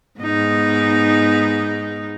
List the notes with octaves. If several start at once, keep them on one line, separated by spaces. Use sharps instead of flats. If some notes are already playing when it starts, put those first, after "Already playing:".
G#2 B3 D#4